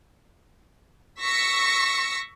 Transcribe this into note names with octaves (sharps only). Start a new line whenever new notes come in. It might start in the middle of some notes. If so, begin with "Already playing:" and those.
C#6 E6 A#6 B6 C#7